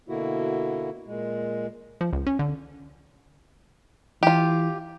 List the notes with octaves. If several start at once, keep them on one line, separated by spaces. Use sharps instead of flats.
B2 D3 A#3 E4 F#4
A#2 G#3
F3
C#2
C#4
D3
E3 F4 G4